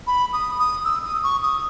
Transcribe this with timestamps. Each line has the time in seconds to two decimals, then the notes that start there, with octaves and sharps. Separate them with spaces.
0.07 B5
0.33 D#6
0.59 D#6
0.85 E6
1.04 D#6
1.23 C#6
1.43 D#6